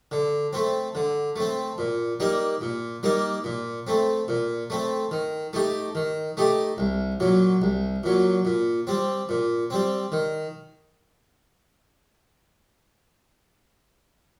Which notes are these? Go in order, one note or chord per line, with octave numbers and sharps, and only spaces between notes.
D3
A3 C4
D3
A3 C4
A#2
G3 A#3 D#4
A#2
G3 A#3 D#4
A#2
A3 C4
A#2
A3 C4
D#3
A3 D#4 G4
D#3
A3 D#4 G4
C2
A#2 F#3
C2
A#2 F#3
A#2
G3 C4
A#2
G3 C4
D#3